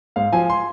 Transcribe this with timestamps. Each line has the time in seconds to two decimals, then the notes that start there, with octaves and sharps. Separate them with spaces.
0.16 G#2 F5
0.32 F3 G#5
0.50 C6